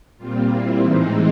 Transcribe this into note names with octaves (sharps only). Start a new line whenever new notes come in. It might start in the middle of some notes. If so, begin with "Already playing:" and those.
A#2 G3 C4 F4
E4
A2 E3 G#3 C4 D#4